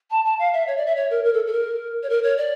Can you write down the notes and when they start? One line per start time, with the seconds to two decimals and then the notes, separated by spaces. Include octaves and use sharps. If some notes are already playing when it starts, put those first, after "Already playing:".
0.11 A5
0.25 A5
0.39 F5
0.54 E5
0.67 C#5
0.77 D5
0.86 E5
0.96 C#5
1.11 A#4
1.24 A#4
1.34 A4
1.46 A4
1.53 A#4
2.03 C#5
2.09 A#4
2.23 C#5
2.38 D5